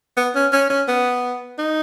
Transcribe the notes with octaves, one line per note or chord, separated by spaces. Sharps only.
B3
C#4
C#4
C#4
B3
D#4